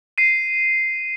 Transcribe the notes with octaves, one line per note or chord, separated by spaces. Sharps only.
C7 D#7